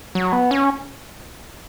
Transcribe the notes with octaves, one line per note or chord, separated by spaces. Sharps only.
F#3
B3
C#4